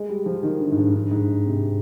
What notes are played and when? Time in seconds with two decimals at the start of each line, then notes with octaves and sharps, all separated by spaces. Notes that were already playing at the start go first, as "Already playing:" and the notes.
Already playing: G#3
0.09 G3
0.26 F3
0.43 D#3
0.60 D3
0.72 G#2
0.77 G2
0.95 G2
1.11 G#2
1.46 C3